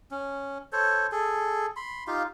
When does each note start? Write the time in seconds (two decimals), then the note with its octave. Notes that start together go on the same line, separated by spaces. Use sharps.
0.11 C#4
0.73 A4 C5 C#5
1.12 G#4 A4
1.76 B5 C6
2.07 D#4 F4 G4 F5